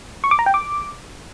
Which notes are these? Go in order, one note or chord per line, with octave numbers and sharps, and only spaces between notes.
C#6
D6
A#5
G5
D6